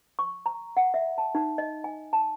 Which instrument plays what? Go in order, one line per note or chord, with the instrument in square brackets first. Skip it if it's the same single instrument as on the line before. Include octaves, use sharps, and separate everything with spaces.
[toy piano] C#6
A#5
F#5
E5
A5
D#4
D#5
G#5
A5